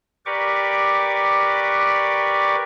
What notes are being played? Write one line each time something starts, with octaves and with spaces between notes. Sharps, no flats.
G4 A#4 B4 D5 C#6 D6